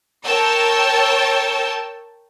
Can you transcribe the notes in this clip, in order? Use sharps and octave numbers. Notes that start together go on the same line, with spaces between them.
A#4 C#5 G5 A5 E6